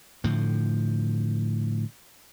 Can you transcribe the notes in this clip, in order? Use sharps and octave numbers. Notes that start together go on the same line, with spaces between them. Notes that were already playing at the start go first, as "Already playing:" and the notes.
A2 D3 F3